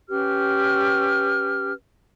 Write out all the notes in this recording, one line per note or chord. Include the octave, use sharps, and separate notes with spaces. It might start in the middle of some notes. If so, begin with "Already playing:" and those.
C#4 G4 B4 F6